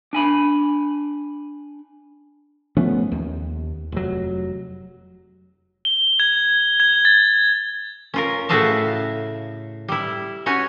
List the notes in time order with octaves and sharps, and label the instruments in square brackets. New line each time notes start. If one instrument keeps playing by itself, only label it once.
[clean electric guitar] D4 G#5 B5
[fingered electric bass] F3 A3 B3 C#4
D#2
F1 F#3
[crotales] G7
G#6
G#6
A6
[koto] C#4 F4 A#4
A2 C#3 F#4 E5 F5 A5
G3 E4
C#4 F#4 C#5 G#5